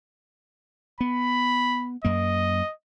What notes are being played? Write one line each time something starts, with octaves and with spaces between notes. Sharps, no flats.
B3 B5
F#2 A#3 D#5